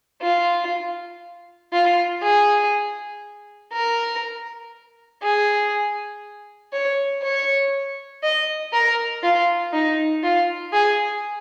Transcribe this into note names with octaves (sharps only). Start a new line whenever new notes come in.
F4
F4
G#4
A#4
G#4
C#5
C#5
D#5
A#4
F4
D#4
F4
G#4